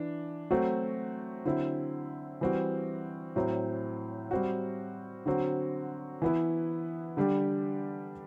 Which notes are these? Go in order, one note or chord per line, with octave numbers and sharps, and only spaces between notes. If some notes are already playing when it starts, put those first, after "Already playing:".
Already playing: E3 D4
F#3 A3 C4 F#4
D3 F#3 C4 E4
E3 G3 C4 F#4
A2 F#3 C4
G3 C4 F#4
D3 F#3 C4 F#4
E3 B3 E4
D3 G3 D4 G4